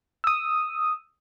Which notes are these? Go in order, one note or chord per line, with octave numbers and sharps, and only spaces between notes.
D#6 E6